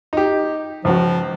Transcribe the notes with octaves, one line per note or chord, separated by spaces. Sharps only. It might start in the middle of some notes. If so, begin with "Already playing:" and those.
D#4 G4
C#2 F3 F#4